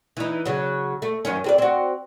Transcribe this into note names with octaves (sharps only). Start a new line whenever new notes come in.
E3 D#4
C#3 F#3
A3
F#2 D#3 C#4
C4 G#4 D5
C4 F#4